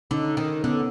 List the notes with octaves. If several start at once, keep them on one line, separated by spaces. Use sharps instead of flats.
D3 C#4 D#4
D#3
D3 B3 C#4